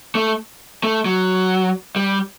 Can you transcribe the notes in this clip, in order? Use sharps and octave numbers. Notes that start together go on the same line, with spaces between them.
A3
A3
F#3
G3